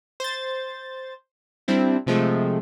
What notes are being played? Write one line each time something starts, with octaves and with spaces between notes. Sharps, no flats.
C5 A6
G3 C4 D4 E4
C3 F3 G#3 A3